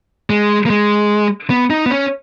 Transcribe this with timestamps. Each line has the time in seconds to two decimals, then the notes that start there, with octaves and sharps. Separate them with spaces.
0.30 G#3
0.66 A#3
0.70 G#3
1.50 B3
1.70 D#4
1.86 B3
1.91 C#4